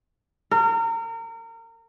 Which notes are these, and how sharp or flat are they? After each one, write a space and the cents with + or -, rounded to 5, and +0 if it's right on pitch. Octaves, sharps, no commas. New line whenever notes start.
A#4 -30